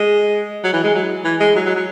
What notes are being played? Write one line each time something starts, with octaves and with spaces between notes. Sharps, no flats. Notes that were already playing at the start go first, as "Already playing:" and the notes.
Already playing: G#3
F#3
E3
G#3
F#3
E3
G#3
F#3
F#3
F#3